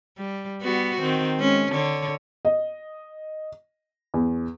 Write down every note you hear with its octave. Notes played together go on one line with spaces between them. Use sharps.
G3
G3 B3 F#4
D#3 C4
G#3 C#4
D3 C#5
D#5
E2